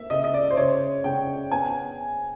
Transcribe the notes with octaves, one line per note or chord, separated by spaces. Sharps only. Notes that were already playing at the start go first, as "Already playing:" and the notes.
Already playing: A#3 E5
C#3 D#5
D#5
D5
C5
C#3 C#5
C#3 G5
B3 G#5